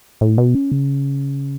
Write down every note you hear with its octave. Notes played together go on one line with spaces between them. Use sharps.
A2
B2
C#4
C#3